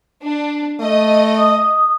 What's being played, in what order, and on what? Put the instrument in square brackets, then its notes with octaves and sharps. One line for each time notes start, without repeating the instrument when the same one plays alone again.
[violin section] D4
[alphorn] A3 [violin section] D#5
[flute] D#6